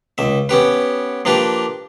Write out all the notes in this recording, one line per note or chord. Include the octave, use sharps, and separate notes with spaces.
C#2 E5
B3 C#4 G4 B4
F3 A#3 D4 G4 B4